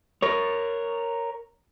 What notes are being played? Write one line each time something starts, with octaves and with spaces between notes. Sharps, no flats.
A#4 C#5